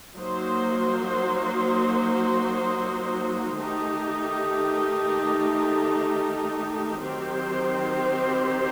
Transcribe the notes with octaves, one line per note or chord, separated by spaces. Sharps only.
F#3 A#3 D#4 F#4 C5
D#3 A3 D#4 G4
D#3 F#3 C4 G4 C5